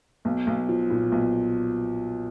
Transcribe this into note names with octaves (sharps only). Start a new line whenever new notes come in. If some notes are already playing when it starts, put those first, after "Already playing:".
B1
B1
F3
A#2
B1